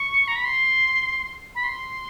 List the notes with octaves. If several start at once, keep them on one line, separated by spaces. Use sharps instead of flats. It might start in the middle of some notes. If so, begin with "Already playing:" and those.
Already playing: C#6
A#5
B5
C6
B5
C6